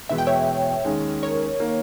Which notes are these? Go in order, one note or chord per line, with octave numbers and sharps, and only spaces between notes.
E2 B2 G#3 B3 E5
G5
C#5 E5
D#2 D#3 G#3 C#4
A#4 C#5
D#3 A#3